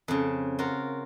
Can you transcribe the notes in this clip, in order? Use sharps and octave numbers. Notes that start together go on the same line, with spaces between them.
F2 C#3
F4 F#4 A#4